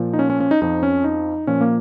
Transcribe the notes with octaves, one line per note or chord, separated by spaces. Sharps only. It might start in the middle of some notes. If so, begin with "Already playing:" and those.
Already playing: A#2 F3
D#4
C#4
C#4
C#4
D#4
F2 F3 D#4
C#4
D#4
A#2 F3 C#4
A#3